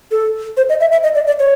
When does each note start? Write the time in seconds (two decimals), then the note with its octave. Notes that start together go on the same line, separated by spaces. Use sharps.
0.11 A4
0.57 C5
0.69 D#5
0.80 E5
0.92 E5
1.03 D#5
1.15 D5
1.27 D5
1.39 C#5